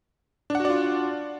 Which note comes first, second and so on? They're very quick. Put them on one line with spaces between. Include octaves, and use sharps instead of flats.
D4 F#5 F#4 D5 F4